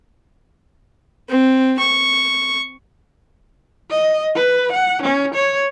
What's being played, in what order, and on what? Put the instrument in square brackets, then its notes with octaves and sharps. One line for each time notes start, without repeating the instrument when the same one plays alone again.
[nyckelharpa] C4
C#6
[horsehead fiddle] D#5
B4
F#5
C#4
C#5